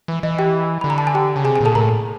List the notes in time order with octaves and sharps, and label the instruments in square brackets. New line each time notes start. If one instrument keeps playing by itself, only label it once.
[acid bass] E3
[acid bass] E3 [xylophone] D#5
[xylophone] G4 G5
[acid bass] D3 [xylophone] B5
[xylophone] A#5
A5
G#5
G4 G5
[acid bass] C#3
[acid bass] C3 [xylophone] G#4 G#5
[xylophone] G#4 G#5
[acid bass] A#2 [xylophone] A4 A5
[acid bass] A2 [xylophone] A#4 A#5